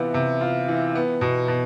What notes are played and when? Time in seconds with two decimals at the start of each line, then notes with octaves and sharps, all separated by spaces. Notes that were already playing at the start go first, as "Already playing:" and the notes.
Already playing: C3 E3 B3 F4
0.14 C3
0.41 F4
0.68 E3
0.95 B3
1.21 B2
1.48 B2